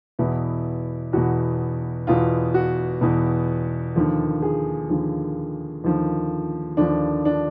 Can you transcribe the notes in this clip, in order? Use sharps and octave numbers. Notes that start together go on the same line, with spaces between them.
E2 B2 E4
E2 B2 F#4
E2 B2 F4
F#4
E2 B2
D#2 D3 F3
G#4
D#2 D3 F3
D#2 D3 F3
D#2 D3 F3 D4
D4